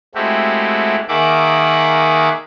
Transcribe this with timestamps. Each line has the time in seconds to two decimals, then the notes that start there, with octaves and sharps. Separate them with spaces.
0.15 G#3 A3 C4 E4 F#4 G4
1.08 D#3 A#3 G#4 E5 F#5 D6